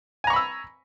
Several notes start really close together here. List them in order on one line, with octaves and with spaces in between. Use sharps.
G#5 A#5 C#6 B5 E6